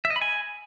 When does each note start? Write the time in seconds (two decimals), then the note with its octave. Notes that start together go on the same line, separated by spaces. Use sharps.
0.05 E5
0.10 D#5
0.16 B5
0.22 G#5